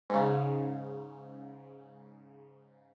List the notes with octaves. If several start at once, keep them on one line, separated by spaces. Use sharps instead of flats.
G#2 C#3